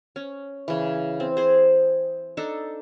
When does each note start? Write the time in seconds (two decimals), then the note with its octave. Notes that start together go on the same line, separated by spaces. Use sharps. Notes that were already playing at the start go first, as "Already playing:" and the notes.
0.16 C#4
0.68 C#3 E3
1.20 C4
1.37 G#4 C5
2.37 D4 D#4 A4